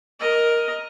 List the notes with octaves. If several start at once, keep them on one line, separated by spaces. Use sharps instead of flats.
A#4 D#5